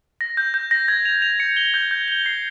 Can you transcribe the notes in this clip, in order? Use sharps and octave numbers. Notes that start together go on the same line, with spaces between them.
A#6
G6
G6
A#6
G#6
F7
F7
C#7
G7
G6
G6
G7
C7